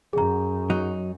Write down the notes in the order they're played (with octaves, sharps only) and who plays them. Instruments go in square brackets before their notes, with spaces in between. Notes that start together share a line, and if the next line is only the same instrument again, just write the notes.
[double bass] F#2 [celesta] G#4 A#5
[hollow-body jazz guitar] F#3 D#4